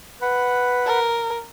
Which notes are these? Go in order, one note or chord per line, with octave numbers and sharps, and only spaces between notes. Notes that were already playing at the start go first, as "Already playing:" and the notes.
B4 F#5 B5
A#4